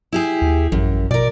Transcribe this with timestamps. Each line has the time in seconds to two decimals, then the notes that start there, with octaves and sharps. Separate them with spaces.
0.12 E4 G4 G#4
0.42 D#2
0.72 A1 F#2
1.11 B2 A#4 D5